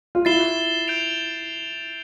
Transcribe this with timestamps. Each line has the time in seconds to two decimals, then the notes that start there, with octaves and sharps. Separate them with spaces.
0.15 F4
0.25 E4 A6 C7 E7 G7
0.88 G6 D7 F7